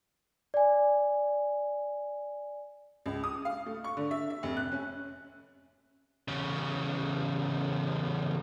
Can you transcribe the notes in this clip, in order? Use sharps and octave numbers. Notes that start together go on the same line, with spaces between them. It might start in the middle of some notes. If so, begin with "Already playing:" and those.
D5 G#5
C#2
D#6
F5
A3
C#6
D3
E5
E5
F1
F#6
C#4
E2 C#3